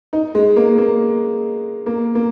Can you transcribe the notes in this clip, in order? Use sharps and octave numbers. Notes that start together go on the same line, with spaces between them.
D#4
G#3
A#3
A#3
A#3
A#3